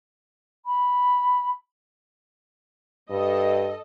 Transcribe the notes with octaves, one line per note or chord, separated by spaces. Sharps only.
B5
G2 A4 D#5